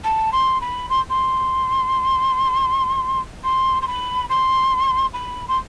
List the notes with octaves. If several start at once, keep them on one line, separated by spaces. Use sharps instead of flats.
A5
C6
B5
C6
C6
C6
C6
B5
C6
B5
C6